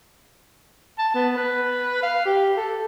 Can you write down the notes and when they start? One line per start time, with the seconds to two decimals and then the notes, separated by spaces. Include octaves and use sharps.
0.99 A5
1.15 B3
1.37 B4
2.02 F5
2.25 G4
2.57 A4